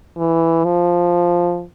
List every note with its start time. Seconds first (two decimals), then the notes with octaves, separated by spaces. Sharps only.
0.17 E3
0.64 F3